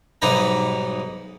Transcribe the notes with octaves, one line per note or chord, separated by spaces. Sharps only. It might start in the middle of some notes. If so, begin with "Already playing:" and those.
B1 G#2 G3 D#4 B4 A#5